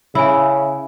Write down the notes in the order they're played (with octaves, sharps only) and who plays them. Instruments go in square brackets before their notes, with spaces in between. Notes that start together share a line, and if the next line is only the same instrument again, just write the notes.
[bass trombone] C#3 [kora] E4 [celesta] E5 G#5